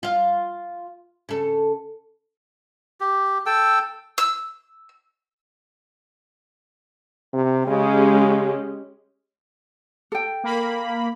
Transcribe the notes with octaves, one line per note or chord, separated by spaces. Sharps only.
F4 F5
C#3 A4
G4
A4 G5 E6
E6
C3
C#3 G#3 C#4 G4
A4 G5
A#3 B5